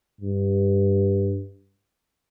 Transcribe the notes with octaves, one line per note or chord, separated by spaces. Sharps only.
G2